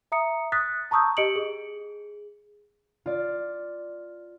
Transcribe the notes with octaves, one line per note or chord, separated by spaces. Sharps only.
E5 A#5 D#6 C#7
D#6 F#6 A6 B6
A5 A#5 C#6 D#6 E6 G6
G4 D#5 C#7 D7 F#7
G#4
F4 D5